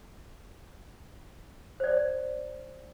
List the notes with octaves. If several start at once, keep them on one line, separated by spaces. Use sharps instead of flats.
C5 D5